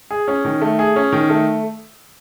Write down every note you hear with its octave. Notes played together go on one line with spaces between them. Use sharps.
G#4
C#4
D#3
A3
G#4
C#4
D#3
A3